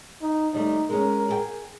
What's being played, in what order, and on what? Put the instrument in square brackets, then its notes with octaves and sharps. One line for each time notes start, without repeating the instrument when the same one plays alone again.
[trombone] D#4
[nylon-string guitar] D#2 G3 A3 [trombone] D#4
[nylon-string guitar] G#3 C#4 [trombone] A#4
[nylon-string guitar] G#4 D5 G5